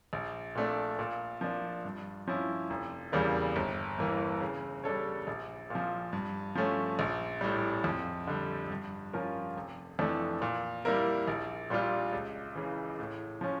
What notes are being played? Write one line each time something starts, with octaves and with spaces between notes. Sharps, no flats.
A#1
A#2 A3 D4
A#2
F3 A#3 D4
G2
F3 C#4 E4
F1
E2 C#3 G3 A#3
G1
G2 E3 A#3
C#3
G3 D4 A4 C#5
A#1
A#2 F3
G2
F3 A3 C#4
A#1
A2 G3
F2
D3 G3
G2
F3 C#4 F4 A#4
F1
F2 E3 A3 D4
A#2
G3 A#3 E4 A#4
A#1
A#2 G3 D4 F4
C#2
C#3 E3
A2
F3 C#4